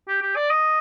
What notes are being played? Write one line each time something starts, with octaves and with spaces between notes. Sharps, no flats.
G4
G4
D5
D#5